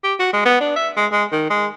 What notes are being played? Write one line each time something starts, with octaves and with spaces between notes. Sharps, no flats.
G4
F#4
G#3
B3
D4
E5
G#3
G#3
D#3
G#3